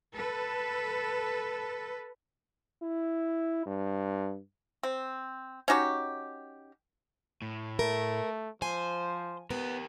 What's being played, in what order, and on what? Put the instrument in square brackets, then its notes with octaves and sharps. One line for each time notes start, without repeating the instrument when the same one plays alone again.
[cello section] A4 B4
[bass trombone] E4
G2
[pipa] C4
C#4 D#4 F#4 G4
[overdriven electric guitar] A2
[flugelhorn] A3 [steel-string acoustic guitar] A#4
[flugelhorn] F3 [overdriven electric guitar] C5 [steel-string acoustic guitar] G#5
[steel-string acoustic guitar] B3 [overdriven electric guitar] G4 A#4